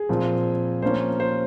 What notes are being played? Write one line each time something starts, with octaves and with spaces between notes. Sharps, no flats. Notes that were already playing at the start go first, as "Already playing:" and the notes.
Already playing: G#4
A#2 F3 C4
F3 A#3 C#4 C5
C5